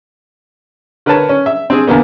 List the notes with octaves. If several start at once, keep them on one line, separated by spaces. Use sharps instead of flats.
D3 A#4 B4 C#5 A5
C#4
E5
C4 D4 G#4
E2 D3 A#3 B3